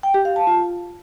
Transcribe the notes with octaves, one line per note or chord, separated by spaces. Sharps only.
G5
G4
F5
A5
F4